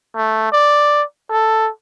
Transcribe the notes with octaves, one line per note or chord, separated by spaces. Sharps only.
A3
D5
A4